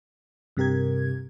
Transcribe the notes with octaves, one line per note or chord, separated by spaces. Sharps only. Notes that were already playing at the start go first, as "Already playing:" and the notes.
G2 C3 G4 A#4 G#6